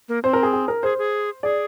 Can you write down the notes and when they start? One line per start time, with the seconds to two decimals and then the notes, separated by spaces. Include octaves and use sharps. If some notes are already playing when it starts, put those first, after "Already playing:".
0.09 A#3
0.23 C4 C5
0.33 A#4
0.43 G#4
0.53 G#4
0.68 A#4
0.83 G#4 C5
0.98 G#4
1.43 G#4 D5